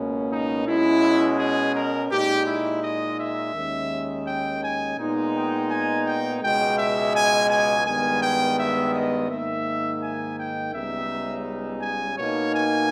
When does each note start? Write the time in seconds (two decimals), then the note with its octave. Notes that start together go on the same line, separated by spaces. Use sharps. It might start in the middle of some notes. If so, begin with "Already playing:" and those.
Already playing: C#2 B2 A#3 C#4
0.32 D#4
0.67 B2 G#3 C#4 E4
1.39 G#4
1.75 A#4
2.11 A#2 G#3 D#4 G4
2.47 E4
2.83 D#5
3.19 E5
3.55 D#2 D#3 G#3 C#4
4.27 G5
4.63 G#5
4.99 A#2 G#3 B3 D#4
5.34 G5
5.71 G#5
6.06 G5
6.42 C#2 B2 G#3 G5
6.78 E5
7.14 G#5
7.51 G#5
7.86 G2 D#3 G#3 B3 G#5
8.22 G5
8.58 E5
8.94 D#5
9.30 G#2 D#3 A#3 D#4 E5
10.02 G#5
10.38 G5
10.74 C#2 C#3 G3 B3 D#4 E5
11.82 G#5
12.18 B2 A#3 D#4 C#5
12.54 G#5